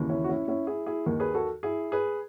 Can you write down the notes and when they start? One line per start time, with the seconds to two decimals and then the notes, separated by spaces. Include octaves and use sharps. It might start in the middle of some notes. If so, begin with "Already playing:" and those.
Already playing: D#2 C#3 E3
0.09 C#4 E4
0.24 F#4
0.29 C#4 E4
0.48 C#4 E4
0.67 E4 G#4
0.86 E4 G#4
1.06 D#2 D#3
1.20 G#4 B4
1.34 F#4 A4
1.63 E4 G#4
1.92 G#4 B4